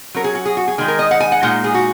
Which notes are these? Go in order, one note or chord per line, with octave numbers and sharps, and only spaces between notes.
F#3 C#4 A#4
G#4
F#4
G#4
F#4
G#4
D#3 G#3 D#4 G#4
A#4
D#5
F#5
G#5
F#5
A#2 G#3 D#4 F#5
G#4
F#4